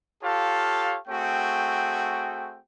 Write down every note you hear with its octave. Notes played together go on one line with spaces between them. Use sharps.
F4 G4 A4 C#5 F5 A5
A3 C4 F#4 G#4 G5